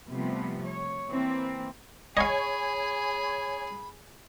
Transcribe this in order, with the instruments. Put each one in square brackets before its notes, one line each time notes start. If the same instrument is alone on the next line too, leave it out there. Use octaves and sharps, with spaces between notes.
[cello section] C3 F3 G3 A3 B3
C#5
E3 A#3 C4
[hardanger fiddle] G#4 [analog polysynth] C#5 G#5 G#6 [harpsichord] D#5 F5 [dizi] B5